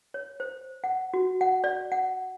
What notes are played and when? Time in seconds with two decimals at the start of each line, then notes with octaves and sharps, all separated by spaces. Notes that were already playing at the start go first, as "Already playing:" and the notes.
0.14 C#5
0.40 C5
0.84 F#5
1.14 F#4
1.41 F#5
1.64 D5
1.92 F#5